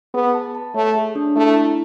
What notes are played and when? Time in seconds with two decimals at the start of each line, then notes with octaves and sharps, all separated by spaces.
0.14 B3 G#4
0.34 A5
0.55 A5
0.75 A3 C#5
0.95 G#4
1.15 D4
1.36 A3 E4
1.56 E4